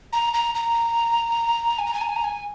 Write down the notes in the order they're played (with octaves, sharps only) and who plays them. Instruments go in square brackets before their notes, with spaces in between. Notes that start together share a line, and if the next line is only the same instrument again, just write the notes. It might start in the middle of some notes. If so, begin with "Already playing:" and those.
[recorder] A#5
A#5
A#5
G#5
A#5
G#5
A#5
G#5
A#5
G#5